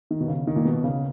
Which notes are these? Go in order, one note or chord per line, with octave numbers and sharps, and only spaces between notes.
D#3
B2
C#3
D#3
A#2
B2
C#3